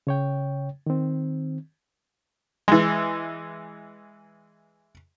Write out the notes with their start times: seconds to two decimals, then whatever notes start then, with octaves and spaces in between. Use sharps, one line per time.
0.07 C#3 C#5 G5
0.86 D#3 C4
2.68 E3 G#3